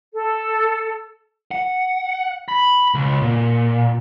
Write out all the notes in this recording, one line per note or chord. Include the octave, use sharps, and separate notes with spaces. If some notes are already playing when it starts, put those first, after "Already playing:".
A4
F#5
B5
C#2
A#2